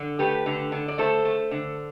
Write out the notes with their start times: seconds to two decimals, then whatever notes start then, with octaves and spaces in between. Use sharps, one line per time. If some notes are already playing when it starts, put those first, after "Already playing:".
Already playing: D3
0.19 A3 G4 B4
0.46 D3
0.72 D3
0.88 D5
0.98 A3 A4 C5
1.25 A3
1.51 D3